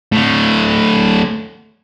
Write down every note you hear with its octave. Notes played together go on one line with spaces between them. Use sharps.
A2 D3